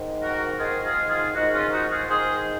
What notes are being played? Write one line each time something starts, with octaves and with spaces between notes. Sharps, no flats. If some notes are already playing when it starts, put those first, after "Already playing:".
Already playing: G#2 D#3
F#4 A#4
G#2 D#3 F4 G#4
F4 G#4
F4 G#4
G#2 D#3 D#4 F#4
C#4 F4
D#4 F#4
F4 G#4
G#2 D#3 G#4 C5